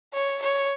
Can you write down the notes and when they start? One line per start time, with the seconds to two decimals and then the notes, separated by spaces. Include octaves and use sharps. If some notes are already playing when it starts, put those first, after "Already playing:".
0.14 C#5
0.42 C#5